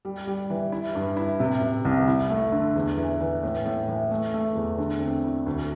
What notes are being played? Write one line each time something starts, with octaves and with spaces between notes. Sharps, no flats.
G3
G3
E3
E4
G2
E4
C3
C3
C2
E4
A3
D3
E2
E3
E3
A2
A2
E3
A3
A3
E2
D3
C4
E4
D2